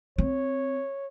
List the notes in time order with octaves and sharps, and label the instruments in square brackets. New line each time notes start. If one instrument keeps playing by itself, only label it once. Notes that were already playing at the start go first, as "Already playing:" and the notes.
[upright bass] C4 [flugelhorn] C#5